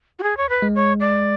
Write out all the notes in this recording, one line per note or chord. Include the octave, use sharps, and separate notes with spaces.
F#4
G#4
C#5
B4
G#3
C#5
D5